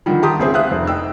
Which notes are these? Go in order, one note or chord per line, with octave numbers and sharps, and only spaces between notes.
D3 D#3 F3 G3
G4 A5 A#5 C6 D6 D#6
C#2 A3 C4 G#4 C5
E5 F5 D#6 E6 F#6
F1 C5
D#4 G5 E6